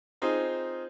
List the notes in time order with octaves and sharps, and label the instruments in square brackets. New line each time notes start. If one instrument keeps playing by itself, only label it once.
[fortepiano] C4 D#4 F4 G#4 C5